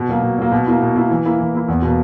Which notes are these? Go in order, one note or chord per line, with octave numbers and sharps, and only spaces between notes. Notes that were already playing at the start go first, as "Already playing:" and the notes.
Already playing: B2
F#3 A#3
B2
F#3 A#3
B2
A#3 E4
B2
A#3 E4
E3
A#3 E4
E3
A#3 E4
E2
B2 A#3